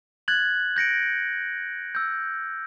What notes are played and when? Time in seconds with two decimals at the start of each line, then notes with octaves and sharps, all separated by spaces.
0.28 F#6 G#6 A6 F#7
0.76 G6 A#6 C#7 D7
1.95 E6 G6